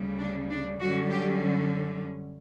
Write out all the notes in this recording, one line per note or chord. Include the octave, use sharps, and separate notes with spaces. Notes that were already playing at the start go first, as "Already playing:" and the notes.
Already playing: D2 C#3 G3
D4
D4
F#2 D3 G3 C#4 F#4
G4